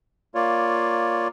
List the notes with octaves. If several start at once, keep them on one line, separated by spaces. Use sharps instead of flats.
A#3 F4 C#5 D5